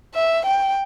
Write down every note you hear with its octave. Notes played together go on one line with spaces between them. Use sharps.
E5
G5